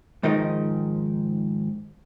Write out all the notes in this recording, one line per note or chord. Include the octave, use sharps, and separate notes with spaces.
G#2 D#3 F3 D#4 A#4 D#5